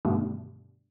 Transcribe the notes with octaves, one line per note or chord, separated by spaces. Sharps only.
G2 B2 D3 D#3 G3 A3